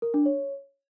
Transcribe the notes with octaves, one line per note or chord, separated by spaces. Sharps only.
A#4
D4
C#5